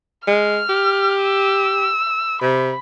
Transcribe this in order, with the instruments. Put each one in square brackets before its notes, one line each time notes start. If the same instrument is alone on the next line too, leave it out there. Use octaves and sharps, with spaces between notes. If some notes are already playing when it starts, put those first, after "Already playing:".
[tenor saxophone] G#3 [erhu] F6
[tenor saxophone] G4
[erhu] E6
[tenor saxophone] C3 [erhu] B5